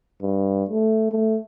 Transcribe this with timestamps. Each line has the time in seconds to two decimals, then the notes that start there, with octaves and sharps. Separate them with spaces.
0.22 G2
0.70 A3
1.12 A3